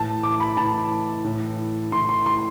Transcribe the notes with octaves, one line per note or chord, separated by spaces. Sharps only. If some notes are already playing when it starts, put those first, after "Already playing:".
Already playing: A2 E3 A5
D6
B5
A2 E3 A5
A2 E3
A2 E3 C6
C6
C6